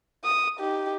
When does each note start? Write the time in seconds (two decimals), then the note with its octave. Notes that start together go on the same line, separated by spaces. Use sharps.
0.24 D#6
0.59 D#4 G4